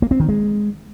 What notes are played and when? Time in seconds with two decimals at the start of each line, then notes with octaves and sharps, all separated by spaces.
0.02 A#3
0.11 C4
0.20 D#3
0.29 G#3